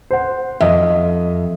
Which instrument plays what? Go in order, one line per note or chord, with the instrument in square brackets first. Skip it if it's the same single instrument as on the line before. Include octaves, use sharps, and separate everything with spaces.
[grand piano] C5 F#5
[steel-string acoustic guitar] F2 [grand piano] D#5 E5